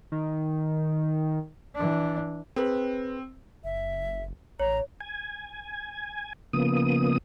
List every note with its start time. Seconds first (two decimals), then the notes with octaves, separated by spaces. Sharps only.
0.12 D#3
1.75 E3 D4
2.56 C4 G#4 B4
3.64 F#1 E5
4.60 A1 C#5 A#5
5.01 G#5
6.53 C#3 F3 A#3 B3 D#6